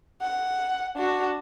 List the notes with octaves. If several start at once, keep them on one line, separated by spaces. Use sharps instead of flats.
F#5
D4 F#4